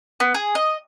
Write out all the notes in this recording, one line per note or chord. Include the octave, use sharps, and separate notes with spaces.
B3
G#4
D#5